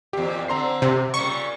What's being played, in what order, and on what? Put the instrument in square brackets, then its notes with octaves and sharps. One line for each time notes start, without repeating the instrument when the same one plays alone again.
[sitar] E2 A#2 [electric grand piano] G4
[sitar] D3 C4 [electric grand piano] A#5 C6 C7
[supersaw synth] C3
[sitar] A#2 C#3 G3 [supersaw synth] C#6